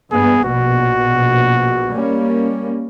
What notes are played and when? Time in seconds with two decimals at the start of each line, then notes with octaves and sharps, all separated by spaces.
0.12 G2 B3 G#4
0.44 A#1 B2 F#4
1.93 G3 A#3 C#4